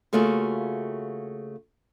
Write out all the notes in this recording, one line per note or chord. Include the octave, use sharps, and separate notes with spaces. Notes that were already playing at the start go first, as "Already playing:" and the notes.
C#3 A3 A#3 F4 F#4 G#4